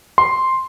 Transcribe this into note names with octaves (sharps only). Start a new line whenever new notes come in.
C6